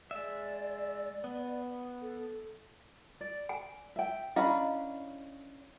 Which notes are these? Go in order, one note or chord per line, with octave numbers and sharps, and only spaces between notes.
G#3 D5 E5
B3
A4
D5
G#5
E5 G5
C#4 D4 E4 D#5 F5 B5